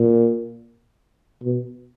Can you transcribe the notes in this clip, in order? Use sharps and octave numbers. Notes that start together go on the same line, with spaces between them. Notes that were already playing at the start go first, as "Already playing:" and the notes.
Already playing: A#2
B2